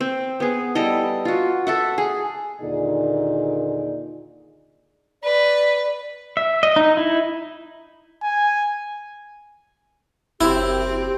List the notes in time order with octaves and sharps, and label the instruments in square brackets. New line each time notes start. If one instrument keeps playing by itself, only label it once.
[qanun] C4
B3 G#4
G3 E4 A4 D#5
F4 F#4
A4 E5 F#5
G#4
[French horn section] D#2 A#2 D3 D#4 G#4 D5
[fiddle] B4 [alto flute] D5
[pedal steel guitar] E5
D#5
D#4
E4
[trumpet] G#5
[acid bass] F#1 [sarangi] C4 [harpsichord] E4 [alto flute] G4